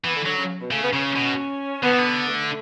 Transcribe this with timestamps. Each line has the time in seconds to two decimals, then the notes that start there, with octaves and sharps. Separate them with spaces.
0.04 E3 B3
0.15 D3
0.26 D3 F#3
0.38 C#3
0.60 B2
0.71 C#3 A3
0.82 B3
0.93 C#3 C#4
1.16 B2
1.83 D3 B3
1.91 E3
1.99 D3
2.28 A3